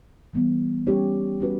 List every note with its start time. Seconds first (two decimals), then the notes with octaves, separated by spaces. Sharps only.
0.33 E3 G3 B3
0.87 G3 C#4 G4 C#5
1.40 G3 C#4 F#4 B4